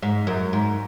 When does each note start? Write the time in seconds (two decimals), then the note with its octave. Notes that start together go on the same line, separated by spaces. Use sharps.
0.02 G#2
0.27 F#2
0.53 G#2